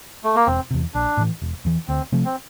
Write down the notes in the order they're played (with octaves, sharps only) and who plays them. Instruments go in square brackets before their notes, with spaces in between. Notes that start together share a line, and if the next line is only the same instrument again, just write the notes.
[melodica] A3
A#3
[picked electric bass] E1 [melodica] C4
[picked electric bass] E2 C3
[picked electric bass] A#1 [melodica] D4
[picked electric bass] A2 E3
E1
E2 E3
[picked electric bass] D2 [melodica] C4
[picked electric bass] C3 F3 A3
[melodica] C4